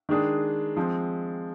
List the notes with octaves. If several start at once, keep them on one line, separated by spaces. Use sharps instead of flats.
D#3 G#3 D4 G#4
F3 G#3 C4